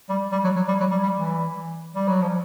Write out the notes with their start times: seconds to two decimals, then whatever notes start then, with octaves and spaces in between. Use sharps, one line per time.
0.09 G3
0.32 G3
0.44 F#3
0.56 F#3
0.68 G3
0.80 F#3
0.91 G3
1.03 G3
1.15 E3
1.94 G3
2.08 F#3
2.21 F3